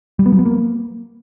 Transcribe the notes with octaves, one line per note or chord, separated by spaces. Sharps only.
G3
B3
F#3
B3
A#3